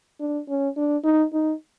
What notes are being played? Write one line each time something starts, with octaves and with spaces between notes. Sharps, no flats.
D4
C#4
D4
D#4
D#4